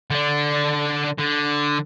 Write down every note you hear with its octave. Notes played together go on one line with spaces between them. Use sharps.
D3 D4
D3